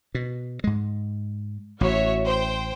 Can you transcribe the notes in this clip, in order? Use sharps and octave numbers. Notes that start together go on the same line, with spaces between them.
B2
G#2 G#3
A1 F#4 C#5 E5
C5 G5